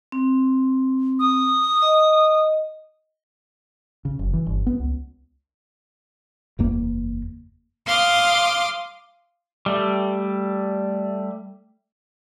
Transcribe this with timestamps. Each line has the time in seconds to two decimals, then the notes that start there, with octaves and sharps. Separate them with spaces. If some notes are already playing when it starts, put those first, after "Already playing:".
0.12 C4
1.19 D#6
1.82 D#5
4.05 C#3
4.19 F#1
4.33 E3
4.46 G1
4.66 B3
4.79 C#2
6.59 F#1 E2 A#3
7.86 F5 C6 D6 D#6
9.66 G3 A3